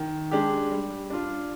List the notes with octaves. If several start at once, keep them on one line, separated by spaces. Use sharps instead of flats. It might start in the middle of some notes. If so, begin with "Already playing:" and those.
Already playing: D#3
G#3 D4 G4
G3
D4 F4